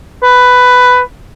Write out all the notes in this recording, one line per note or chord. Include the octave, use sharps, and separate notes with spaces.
B4